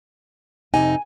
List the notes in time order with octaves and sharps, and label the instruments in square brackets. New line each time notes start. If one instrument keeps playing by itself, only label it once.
[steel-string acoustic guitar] F2 C3 D#4 [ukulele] G#5